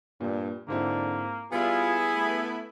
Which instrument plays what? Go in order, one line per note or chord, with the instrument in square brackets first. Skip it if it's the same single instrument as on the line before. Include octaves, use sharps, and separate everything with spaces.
[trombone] G2 [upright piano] A#2
[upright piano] G#2 C4 E4 [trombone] D3 [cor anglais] A#3
[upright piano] G3 [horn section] B3 E4 [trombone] F4 [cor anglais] G#4
[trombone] A3